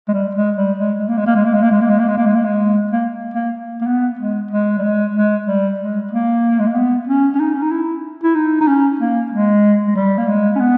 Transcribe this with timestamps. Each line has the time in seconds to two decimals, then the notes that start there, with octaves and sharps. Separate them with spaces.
0.08 G#3
0.14 G3
0.35 G#3
0.57 G3
0.78 G#3
0.99 G#3
1.08 A#3
1.17 G#3
1.26 A#3
1.36 G#3
1.45 A#3
1.53 G#3
1.63 A#3
1.71 G#3
1.81 A#3
1.89 G#3
1.99 A#3
2.08 G#3
2.17 A#3
2.26 G#3
2.35 A#3
2.44 G#3
2.91 A#3
3.34 A#3
3.81 A#3
3.87 B3
4.19 G#3
4.51 G#3
4.78 G3
4.83 G#3
5.16 G#3
5.47 G3
5.80 G#3
6.11 A#3
6.59 G#3
6.67 A#3
6.75 B3
7.07 C#4
7.35 C#4
7.40 D#4
7.54 C#4
7.62 D#4
7.71 E4
8.24 E4
8.35 D#4
8.61 D#4
8.67 C#4
9.00 A#3
9.32 G#3
9.87 G#3
9.95 G3
10.18 A#3
10.28 G#3
10.55 C#4
10.60 B3